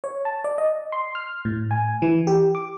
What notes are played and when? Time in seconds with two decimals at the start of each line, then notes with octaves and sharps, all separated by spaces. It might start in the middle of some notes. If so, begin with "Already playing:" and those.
0.04 C#5
0.25 A5
0.44 D5
0.58 D#5
0.92 C6
1.15 F6
1.45 A2
1.71 G#5
2.02 E3
2.27 G4
2.55 D6